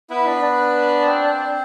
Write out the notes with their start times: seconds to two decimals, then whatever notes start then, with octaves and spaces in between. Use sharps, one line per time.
0.10 B3 E4 B4
0.26 D4
0.42 D4
1.05 C4 C5